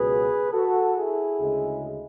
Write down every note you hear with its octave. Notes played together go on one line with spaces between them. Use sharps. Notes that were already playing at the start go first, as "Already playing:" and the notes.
Already playing: C#2 B2 F#3 B3 G#4 B4
F#4 A4
E4 G#4
D2 C#3 G#3